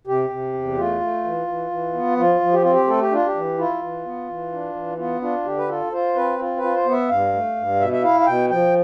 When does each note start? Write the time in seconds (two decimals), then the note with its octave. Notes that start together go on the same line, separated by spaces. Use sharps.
0.07 C3 G4
0.30 C3
0.54 E2
0.77 A3 F4
1.00 A3
1.24 E3
1.47 E3
1.71 E3
1.94 B3
2.17 F3 F4
2.41 F3
2.53 G4
2.62 C4 F4
2.72 G4
2.87 A3 A4
3.01 G4
3.11 D4 F4
3.26 G4
3.35 E3
3.58 E4 F4
3.81 E3
4.05 B3
4.28 E3
4.52 D4
4.75 E3
4.98 B3 F4
5.21 D4 F4
5.45 D3 G4
5.58 B4
5.68 F4 A4
5.92 F4 C5
6.16 C4 B4
6.39 F4
6.57 B4
6.63 F4
6.75 C5
6.86 B3
6.92 E5
7.09 G2 F5
7.33 A3
7.56 G2
7.80 B2 E5
7.93 E5
8.03 E4 F5
8.20 F5
8.26 B2 G5
8.50 F3 G5